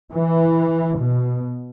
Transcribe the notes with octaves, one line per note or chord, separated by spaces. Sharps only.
E3
B2